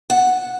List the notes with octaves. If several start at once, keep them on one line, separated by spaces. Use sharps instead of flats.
F#5